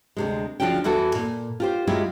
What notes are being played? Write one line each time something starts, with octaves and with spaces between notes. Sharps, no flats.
D2 C3 G#3
D2 C#3 F3 D4 F#4 G5
E2 E3 E4 F#4 A4 G#5
A#2
F4 G4 C5
F#3 G#3 E4 F4 G4